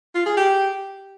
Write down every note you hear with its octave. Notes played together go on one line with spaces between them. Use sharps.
F4
G#4
G4